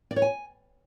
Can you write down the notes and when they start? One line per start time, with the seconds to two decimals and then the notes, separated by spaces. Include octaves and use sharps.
0.11 D5
0.16 C#5
0.22 G#5